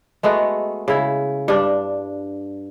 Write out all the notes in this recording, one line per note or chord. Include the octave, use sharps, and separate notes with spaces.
G#3 A3 B3 F#4
C#3 E4
G2 D4